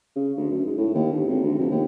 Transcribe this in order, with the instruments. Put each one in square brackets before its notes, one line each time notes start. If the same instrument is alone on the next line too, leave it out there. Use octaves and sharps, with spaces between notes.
[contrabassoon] C#3
D2
F#2
G#2
A2
D#2
G1
G#1
D2
F1
D#2